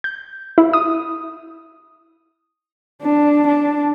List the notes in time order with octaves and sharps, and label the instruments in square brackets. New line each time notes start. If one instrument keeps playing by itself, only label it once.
[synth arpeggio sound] G6
E4
D#6
[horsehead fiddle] D4
D4